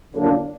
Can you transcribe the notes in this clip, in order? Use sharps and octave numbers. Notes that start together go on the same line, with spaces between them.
D3 F#3 A#3 D4